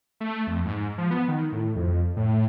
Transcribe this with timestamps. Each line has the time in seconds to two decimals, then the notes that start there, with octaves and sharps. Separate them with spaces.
0.20 A3
0.47 F2
0.65 G#2
0.98 F3
1.11 B3
1.28 D#3
1.53 A2
1.76 F2
2.16 A2